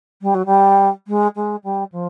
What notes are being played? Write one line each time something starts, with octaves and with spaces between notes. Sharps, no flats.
G3
F#3
G3
G#3
G#3
G3
F3